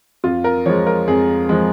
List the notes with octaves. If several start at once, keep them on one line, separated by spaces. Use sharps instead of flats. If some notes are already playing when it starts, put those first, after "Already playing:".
F2 F4
A#4
F3 G#3 C#5
A#4
F2 G#4
F3 G#3